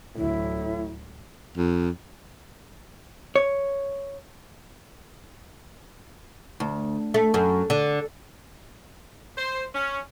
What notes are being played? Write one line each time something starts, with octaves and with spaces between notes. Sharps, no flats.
A1 D2 A2 F#3 E4
F2
C#5
D2
A3
F#2
D3
C5
C#4